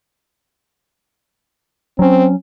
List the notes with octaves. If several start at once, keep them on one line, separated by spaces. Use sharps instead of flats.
F#3 C4 C#4